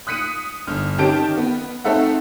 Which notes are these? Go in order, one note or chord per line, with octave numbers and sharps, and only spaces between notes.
D#6 F#6 B6 C#7 D#7
G1 F6
D#3 C#4 G4 A5 G6 D7
B3
A3 C4 D#4 A4 E5 F#5